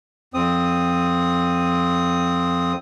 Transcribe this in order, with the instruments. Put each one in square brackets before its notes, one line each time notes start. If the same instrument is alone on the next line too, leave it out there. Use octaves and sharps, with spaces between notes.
[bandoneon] F2 C4 D#6